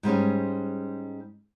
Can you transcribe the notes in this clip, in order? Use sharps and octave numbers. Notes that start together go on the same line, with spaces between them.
G#2 G3 G#3 C#4